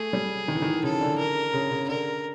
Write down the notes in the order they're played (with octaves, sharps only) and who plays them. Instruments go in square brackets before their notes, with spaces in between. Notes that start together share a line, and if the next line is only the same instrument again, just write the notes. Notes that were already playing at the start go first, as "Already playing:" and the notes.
Already playing: [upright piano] A3 [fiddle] G#4
[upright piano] G3
D#3
E3
D#3
[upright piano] C#3 [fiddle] A4
[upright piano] D3
[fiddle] A#4
[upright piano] C#3
C#3
[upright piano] D3 [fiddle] A#4